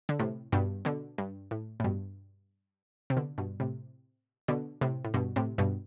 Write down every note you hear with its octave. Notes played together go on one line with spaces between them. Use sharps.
D3
A2 C3
G2 B2
B2 D3
G2
A2
A2
G2 B2
C3
B2 D3
G2 B2
A2 C3
B2 D3
A2 C3
A2
G2 B2
A2 C3
G2 B2